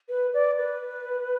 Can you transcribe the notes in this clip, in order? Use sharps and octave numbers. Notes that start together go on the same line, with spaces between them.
B4
D5
B4